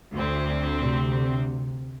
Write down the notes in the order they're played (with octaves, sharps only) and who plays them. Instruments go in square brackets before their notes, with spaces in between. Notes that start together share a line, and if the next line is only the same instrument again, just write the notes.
[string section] D2 C4
[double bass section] C3